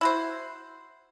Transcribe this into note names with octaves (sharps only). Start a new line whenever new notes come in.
E4 F#4 C5